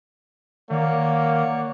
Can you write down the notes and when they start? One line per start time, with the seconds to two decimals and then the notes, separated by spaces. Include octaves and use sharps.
0.71 D#3 A#3 C#5 D5 F#5